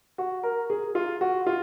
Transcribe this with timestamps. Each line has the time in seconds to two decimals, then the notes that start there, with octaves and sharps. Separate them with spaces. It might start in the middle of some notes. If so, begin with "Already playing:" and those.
0.18 F#4
0.43 A#4
0.70 G#4
0.95 F4
1.21 F#4
1.47 F4